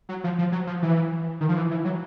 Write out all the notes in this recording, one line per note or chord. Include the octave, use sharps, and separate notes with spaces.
F#3
F3
F3
F#3
F3
E3
D#3
F3
E3
E3
F#3